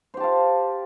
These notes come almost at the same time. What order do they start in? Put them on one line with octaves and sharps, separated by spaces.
C5 G4 A5 F5